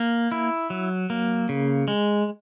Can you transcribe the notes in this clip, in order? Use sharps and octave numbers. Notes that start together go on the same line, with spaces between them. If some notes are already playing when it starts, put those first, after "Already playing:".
Already playing: A#3
E4
F#3
A#3
C#3
G#3